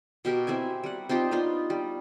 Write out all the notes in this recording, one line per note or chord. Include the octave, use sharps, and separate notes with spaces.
B2 G4 A#4
C4 E4 E5 G#5
G3 F#5
C4 D#4 F4 G4
B3 D4 D#4 F4
G3